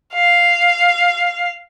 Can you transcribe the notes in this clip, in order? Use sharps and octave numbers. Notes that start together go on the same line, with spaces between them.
F5